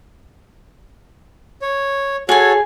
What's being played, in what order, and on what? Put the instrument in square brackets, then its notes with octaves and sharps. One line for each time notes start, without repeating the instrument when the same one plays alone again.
[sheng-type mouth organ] C#5
[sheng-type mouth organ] F#4 A4 C#5 [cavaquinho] G#4 G#5